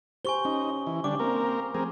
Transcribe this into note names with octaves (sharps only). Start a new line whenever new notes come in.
G4 C5 G#5 C#6 G7
C#4 D#4
E3
D3 G3 D4 D6
A#3 C4 A#4
F3 A3 C4 G#4 A#4